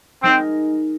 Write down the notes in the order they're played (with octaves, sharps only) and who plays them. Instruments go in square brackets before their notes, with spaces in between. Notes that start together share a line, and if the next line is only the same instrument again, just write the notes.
[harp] G#3 D#4 A#4 [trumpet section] C4